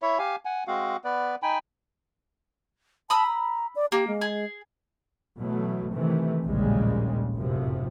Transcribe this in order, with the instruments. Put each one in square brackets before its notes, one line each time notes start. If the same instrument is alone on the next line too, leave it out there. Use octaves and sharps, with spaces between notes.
[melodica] E4 C#5 E5
G4 F5 G#5
F#5 G#5
G#3 C4 F#4 F5
B3 B4 D5
D#4 G5 G#5 B5
[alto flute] A5 [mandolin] B5 D#6 E6
[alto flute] A#5
D5
[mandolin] A#3 [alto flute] G4
[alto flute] G#3
[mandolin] G#4
[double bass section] B2 E3 F#3 A3
C3 D#3 E3 A3
A#1 D#2 A2 C#3 G3 G#3
F1 F#2 A2 C3 F3